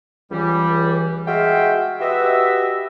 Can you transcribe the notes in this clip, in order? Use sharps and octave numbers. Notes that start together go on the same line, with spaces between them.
C#2 E3 G3
G#3 F#4 G#4 E5 F5 G5
F#4 G4 B4 D#5 E5